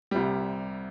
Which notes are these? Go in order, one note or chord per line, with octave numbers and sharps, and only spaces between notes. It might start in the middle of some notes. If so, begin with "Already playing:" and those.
C2 C3 G3